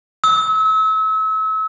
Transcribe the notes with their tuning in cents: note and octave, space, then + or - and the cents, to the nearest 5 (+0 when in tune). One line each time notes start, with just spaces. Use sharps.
E6 -35